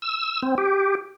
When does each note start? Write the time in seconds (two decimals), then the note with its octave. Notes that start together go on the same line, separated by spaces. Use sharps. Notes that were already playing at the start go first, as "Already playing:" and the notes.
0.02 E6
0.42 C4
0.58 G4